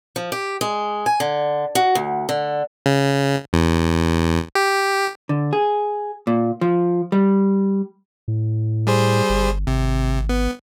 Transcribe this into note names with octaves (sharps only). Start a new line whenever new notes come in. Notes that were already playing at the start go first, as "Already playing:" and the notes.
F3
G4
G#3
G#5
D3
F#4
D2
D3
C#3
E2
G4
D3
G#4
A#2
F3
G3
A2
G3 G#4 C5
G1
G#1 C3
B3